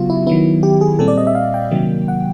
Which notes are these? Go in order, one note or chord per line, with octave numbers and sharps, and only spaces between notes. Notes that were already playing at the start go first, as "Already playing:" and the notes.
Already playing: C#3 F#3 B3 F4 F#4
E4
D#3 F#3 B3 E4
G4
G#4
A#2 G3 C4 A4
D5
D#5
E5
F5
G5
C3 D#3 F#3 A#3
F#5